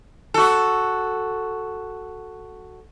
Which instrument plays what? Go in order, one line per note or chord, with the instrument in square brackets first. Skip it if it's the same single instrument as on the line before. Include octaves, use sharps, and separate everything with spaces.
[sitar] F#4 A4